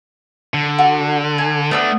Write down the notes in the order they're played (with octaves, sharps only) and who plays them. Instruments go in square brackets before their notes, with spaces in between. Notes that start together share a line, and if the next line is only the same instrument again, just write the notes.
[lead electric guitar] D3
[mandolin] F#4
G#5
[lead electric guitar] A3 D4 [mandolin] B3 A5 E6